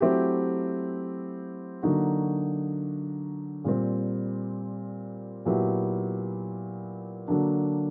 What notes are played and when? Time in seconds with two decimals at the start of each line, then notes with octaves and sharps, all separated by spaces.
0.01 F#3 A3 C4 E4 G4
1.83 D3 F#3 A#3 D#4 F#4
3.64 A#2 G3 C4
5.45 A#2 F#3 B3 E4 G4
7.28 D3 F#3 A#3 D4